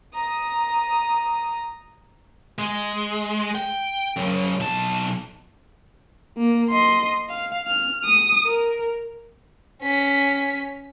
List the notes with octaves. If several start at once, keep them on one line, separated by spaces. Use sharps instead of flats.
A#5 D#6
G#3
G5
F#2 C#3
B1 A5
A#3
D#5 C6
F5
F6
D#6
A#4
C#4 B6